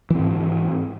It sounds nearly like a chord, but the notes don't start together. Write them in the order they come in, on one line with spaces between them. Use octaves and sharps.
E3 C4 G#2